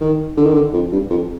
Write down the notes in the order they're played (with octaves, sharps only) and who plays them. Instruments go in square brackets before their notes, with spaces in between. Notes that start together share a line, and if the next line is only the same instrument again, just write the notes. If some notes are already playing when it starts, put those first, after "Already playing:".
[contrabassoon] D#3
D3
D#3
D3
F2
G2
F2